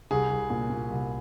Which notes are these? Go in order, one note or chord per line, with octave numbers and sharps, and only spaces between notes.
C2 G#4
C2
A#2
A#2
C2